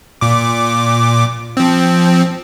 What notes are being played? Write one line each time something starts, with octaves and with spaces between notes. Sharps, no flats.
A#2 D6
F3 C4